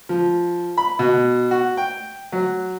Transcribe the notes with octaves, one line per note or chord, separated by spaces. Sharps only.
F3
B5
B2
F#4
G5
F#3